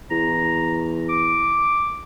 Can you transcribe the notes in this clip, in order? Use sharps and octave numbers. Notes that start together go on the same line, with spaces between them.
E2 A#5
D6